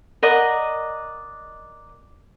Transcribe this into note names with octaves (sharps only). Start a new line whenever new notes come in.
A#4 D5 D#5 F#5